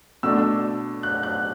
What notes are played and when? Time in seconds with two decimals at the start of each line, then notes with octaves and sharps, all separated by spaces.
0.23 B2 A3 D4 E6
1.03 F#6
1.23 F#6